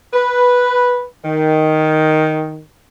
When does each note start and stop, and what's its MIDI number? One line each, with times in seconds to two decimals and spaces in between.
0.13 1.05 71
1.24 2.61 51